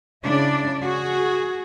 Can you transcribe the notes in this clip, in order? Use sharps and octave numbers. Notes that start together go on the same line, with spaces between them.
C#3 D4 E4 D5
F#4 G#4